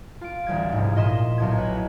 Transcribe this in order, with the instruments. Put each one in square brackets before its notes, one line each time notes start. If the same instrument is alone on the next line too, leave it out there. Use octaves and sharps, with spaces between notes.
[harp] F4 D7
A1 D2 G3 G#6
F1 G#2
A#2 D#5 C6 B6 E7
B1 A2 G#6
B4 C#5